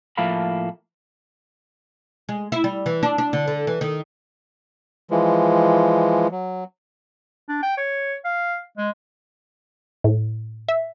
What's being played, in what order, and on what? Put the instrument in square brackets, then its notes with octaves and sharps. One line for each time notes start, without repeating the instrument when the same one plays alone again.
[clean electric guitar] A2 F3 A#3 E5 F5 B5
[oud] G#3
E4
G3
E3
D4
D4
D3
D3
E3
D#3
[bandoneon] E3 F3 G#3
F#3
[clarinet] D4
G5
C#5
F5
G#3
[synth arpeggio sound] A2
E5